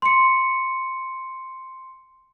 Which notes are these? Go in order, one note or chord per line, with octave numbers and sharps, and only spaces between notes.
C6 C#7